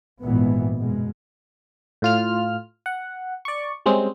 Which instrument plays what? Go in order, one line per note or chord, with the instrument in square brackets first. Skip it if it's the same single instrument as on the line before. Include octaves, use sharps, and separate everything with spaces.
[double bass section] G#1 G2 A#2 E3 G#3 B3
F#2 B2 G#3
[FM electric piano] A2 F4 F6
F#5
D5 C#6
G3 G#3 C4 C#4